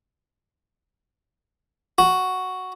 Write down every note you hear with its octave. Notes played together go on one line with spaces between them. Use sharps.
F#4